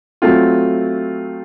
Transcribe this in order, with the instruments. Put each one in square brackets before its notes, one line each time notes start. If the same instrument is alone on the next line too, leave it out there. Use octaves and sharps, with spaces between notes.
[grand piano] F#3 A3 C4 F4